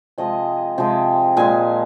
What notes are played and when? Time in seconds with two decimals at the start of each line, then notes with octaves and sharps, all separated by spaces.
0.18 C3 F3 G#3 D#5
0.78 C3 F3 G#3 G5
1.37 A#2 G#3 G#5